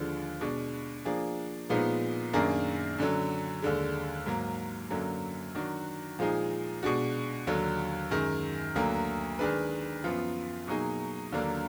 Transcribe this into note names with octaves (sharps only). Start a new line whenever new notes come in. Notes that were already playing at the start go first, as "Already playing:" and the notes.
Already playing: D#2 D3 F3 G#3 D4
B2 G#3 D4
F3 A#3 D4 G#4
A#2 F3 G#3 B3 D#4
F#2 D#3 A#3 D4 G#4
F#2 D3 F#3
D#2 D3 G#3
G#2 F#3 A#3
F#2 D3 F#3 A#3
D#3 F#3 D4 F#4
A#2 F3 G#3 D#4 G#4
B2 G#3 D4 F#4
D#2 D3 F#3
F#2 D#3 G#3
D2 D3 F#3 A#3
D#3 G#3 D4 G#4 B4
F#2 F3 B3 F4
B2 F#3 A#3 D#4 G#4
D#2 D3 F#3 A#3 D4